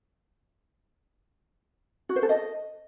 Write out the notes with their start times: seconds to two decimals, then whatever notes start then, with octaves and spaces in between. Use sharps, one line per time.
2.09 F#4
2.16 C5
2.23 A4
2.29 D#5